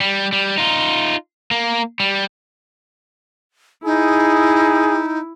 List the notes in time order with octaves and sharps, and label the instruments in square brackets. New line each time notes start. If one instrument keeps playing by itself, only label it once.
[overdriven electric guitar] G3
G3
D#4 F4
A#3
G3
[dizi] D#4 [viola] E4 [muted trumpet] G#4